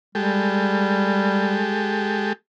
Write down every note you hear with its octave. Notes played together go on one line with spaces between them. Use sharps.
G3 G#3 G4 A4